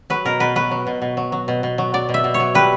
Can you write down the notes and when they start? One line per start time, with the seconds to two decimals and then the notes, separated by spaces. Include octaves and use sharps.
0.10 F#3 B4
0.25 B2 A#4
0.40 B2 B4
0.55 F#3 B4
0.71 F#3
0.87 B2
1.02 B2
1.17 F#3
1.32 F#3
1.48 B2
1.63 B2
1.78 F#3
1.94 F#3 D5
2.09 B2
2.14 E5
2.24 B2
2.34 C#5
2.40 F#3
2.55 G3 B4